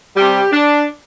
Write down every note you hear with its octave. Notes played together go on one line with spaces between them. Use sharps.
C3 G3 G4
D4